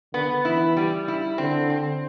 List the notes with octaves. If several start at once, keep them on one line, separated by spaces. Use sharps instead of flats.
D3 B3
E3 E4
G3
E4
D3 C4
C4